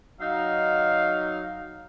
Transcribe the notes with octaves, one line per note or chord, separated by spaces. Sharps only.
F#3 D#4 F5